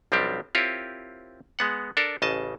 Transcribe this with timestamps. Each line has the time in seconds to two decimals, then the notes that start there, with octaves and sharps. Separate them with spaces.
0.12 B1 F3 G3 C4 D4 G4
0.55 C4 E4 F4 G4 A#4 C#5
1.59 G#3 B3 F#5
1.97 D4 A4 A#4
2.22 A1 C#3 D#5 A5